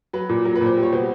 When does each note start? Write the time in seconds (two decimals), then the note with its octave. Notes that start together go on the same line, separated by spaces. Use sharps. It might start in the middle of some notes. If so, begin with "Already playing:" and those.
0.13 F#3 B4
0.29 A#2
0.45 F#3 A#4
0.55 B4
0.61 A#2
0.66 C5
0.77 G3
0.83 C#5
0.93 B2 C5